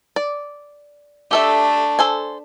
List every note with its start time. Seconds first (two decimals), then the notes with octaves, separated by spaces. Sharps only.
0.16 D5
1.31 A3 D4 G4 A4 E5
1.99 A4 C5 G#5